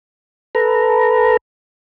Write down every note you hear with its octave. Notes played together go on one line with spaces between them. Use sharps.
A4 B4 A#5